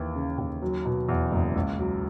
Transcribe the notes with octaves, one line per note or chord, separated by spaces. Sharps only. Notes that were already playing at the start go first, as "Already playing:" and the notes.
Already playing: D#2 E3
C#3
D#2
F#3
B2
E2
F#1
C#2
F#3